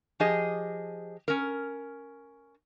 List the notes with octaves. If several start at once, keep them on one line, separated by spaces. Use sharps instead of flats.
F3 G4 G#4 D#5
C#4 A#4